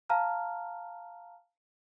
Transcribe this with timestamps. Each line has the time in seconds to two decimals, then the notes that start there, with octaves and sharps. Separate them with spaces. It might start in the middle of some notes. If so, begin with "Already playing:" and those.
0.10 F5 A5 A#5 F6